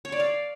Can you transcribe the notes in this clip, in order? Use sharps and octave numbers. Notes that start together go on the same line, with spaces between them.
C#5
D5
F5